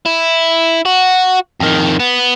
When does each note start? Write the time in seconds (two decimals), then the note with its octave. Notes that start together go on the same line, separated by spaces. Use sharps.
0.06 E4
0.85 F#4
1.60 F2 D#3
2.00 B3